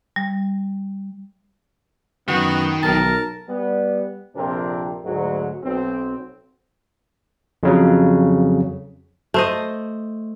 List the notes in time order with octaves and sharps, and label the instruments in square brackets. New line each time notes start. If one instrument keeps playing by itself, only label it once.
[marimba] G3
[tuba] F#2 [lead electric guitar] D#3 [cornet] B3 [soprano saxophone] F#4
[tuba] B1 [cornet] A#4 [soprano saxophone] A5
[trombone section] G3 B3
A#1 F2 C3 C4 D4 A#4
D2 G#2 F#3
B1 C4
[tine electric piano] F2 C#3 F#3
[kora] A3 C5 D#5